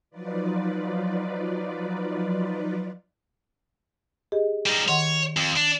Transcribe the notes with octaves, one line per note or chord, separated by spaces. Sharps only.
F3 F#3 D#4 F4 B4 D5
G4 G#4 D#5
G3 D#4
D#3 C#5 F#5 C6
F2
D4